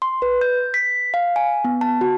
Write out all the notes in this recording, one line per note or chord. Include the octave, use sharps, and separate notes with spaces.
C6
B4
G6
B6
F5
G#5
B3
A5
F#4